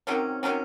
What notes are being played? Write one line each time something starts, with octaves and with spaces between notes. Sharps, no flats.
C3 D#3 F#3 C#4
C3 D#3 F#3 C#4